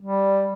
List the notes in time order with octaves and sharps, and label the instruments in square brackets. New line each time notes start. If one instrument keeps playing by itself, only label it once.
[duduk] G3